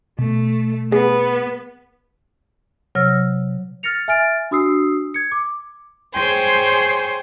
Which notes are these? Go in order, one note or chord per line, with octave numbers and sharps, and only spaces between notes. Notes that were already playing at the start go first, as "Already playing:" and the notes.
B2 A3
B3 G#4
C3 F#3 C#5 E6 F6 A#6
F6 A6 A#6 C#7 F7
E5 G#5 F6 A6 D7
D4 F#4 D#6 E6 C7
G#6 C#7
D6
G#4 C5 C#5 G5 G#5 C6